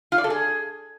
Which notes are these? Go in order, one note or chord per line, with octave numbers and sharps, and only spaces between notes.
F4
D5
A4
G#4